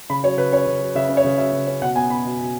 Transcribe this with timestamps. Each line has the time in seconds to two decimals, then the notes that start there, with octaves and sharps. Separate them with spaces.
0.10 C#3 B5
0.23 F#3 C#5
0.37 C#3 B4
0.53 C#4 C#5
0.67 C#3
0.81 F#3
0.95 C#3 E5
1.09 C#4
1.17 C#5
1.24 C#3
1.38 F#3 E5
1.53 C#3
1.67 C#4
1.82 B2 F#5
1.95 B3 G#5
2.10 B3 B5
2.25 B2
2.40 B2